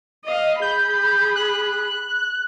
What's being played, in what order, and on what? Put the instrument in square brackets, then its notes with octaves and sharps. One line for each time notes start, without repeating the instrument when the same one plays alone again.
[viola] D#5 F5
[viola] G#4 B5 [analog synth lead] G6
[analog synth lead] F#6